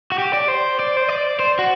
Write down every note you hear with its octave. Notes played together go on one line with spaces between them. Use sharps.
F#4
G4
D5
C5
D5
C5
D5
C5
F#4